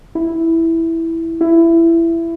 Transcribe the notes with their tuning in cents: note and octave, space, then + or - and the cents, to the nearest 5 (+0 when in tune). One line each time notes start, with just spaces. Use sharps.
E4 -5
E4 +15